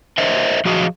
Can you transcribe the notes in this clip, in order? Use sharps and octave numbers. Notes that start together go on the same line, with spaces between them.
A#4 C5 D#5 E5
F3 F#3 F#4 G#4 D#5 F5